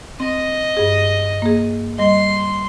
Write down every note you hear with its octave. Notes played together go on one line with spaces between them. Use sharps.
C4 D#5
G2 G#4
A#3 G#4
G3 D#5 C6